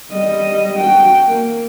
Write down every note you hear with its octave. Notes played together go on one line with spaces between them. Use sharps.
G3 D#5
F#4 G5
A#3